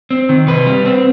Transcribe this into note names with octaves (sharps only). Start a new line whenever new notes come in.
C4
D#3
C3 B4
G3
C4